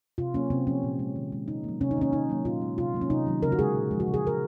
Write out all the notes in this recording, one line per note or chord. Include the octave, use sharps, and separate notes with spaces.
C3 F4
F#3 A#3 C#4
C3 C4
F3 A#3 C#4
A#2
G#3
D#3
G#3
C3 D#4
F#3 A#3
C3 C#4
D#4
D#3 A#3 C#4
C3 D#4
F#3 A#3
A#2 F4
G#3
C3 F4
F#3 A#3
C#4
C3 D#4
D#3 F#3
C#3 A#4
F#4
G#3 G#4
A#2
F3 G#3
F#4
C#3
G#4
G#3 A#4